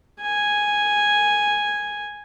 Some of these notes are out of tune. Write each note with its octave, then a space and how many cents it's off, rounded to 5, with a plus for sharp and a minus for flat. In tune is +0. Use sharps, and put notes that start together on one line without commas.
G#5 -5